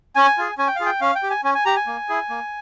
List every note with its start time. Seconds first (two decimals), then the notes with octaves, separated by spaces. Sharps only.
0.16 C#4 G#5
0.38 F4 G#4
0.58 C#4 G#5
0.67 G5
0.76 F5
0.80 F4 G#4
0.86 G5
1.01 C#4 F5
1.15 G5
1.23 G4
1.30 G#5
1.44 C#4 G#5
1.54 G#5
1.65 G4 A#5
1.76 G#5
1.87 A#3
2.09 E4 G#4
2.30 A#3